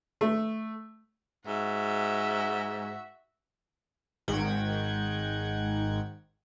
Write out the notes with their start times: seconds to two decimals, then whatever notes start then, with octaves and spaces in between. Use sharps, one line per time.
0.21 A3
1.47 G#2 F#4 E5
4.28 G#1 G#2 D#3 F#5 G5 G#6